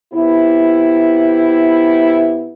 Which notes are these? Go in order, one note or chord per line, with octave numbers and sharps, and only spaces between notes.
C3 B3 E4